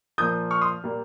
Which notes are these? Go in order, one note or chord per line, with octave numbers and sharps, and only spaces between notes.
A#2 F3 A#3 D#6 G6
C#6 F6
C6 D#6
A#2 G3 A#3